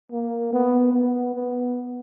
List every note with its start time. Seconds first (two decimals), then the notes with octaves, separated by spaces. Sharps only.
0.12 A#3
0.53 B3
0.93 B3
1.34 B3